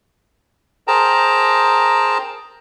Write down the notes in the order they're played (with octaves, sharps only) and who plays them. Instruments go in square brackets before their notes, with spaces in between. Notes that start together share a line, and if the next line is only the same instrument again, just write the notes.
[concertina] G#4 A#4 C5 G5 A5 A#5